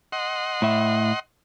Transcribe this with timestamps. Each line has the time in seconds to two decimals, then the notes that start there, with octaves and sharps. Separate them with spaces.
0.12 D#5 F#5 C6
0.62 A2 E5